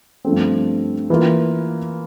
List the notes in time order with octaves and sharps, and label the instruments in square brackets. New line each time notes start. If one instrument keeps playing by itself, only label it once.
[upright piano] G2 F3 A3 C4
E3 A#3 F4